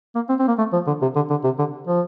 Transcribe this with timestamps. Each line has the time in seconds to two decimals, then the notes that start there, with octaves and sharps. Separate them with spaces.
0.15 A#3
0.29 C4
0.40 C4
0.48 A#3
0.58 A3
0.73 F3
0.87 D3
1.02 C3
1.16 D3
1.30 D3
1.44 C3
1.59 D3
1.87 F3